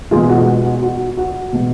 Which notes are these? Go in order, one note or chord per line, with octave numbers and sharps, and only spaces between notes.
B2 G#3 F4 G#4
F#4
F#4
F#4
F#4
B2 G#3